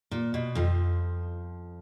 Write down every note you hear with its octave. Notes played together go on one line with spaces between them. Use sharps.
A#2
B2
F2 F3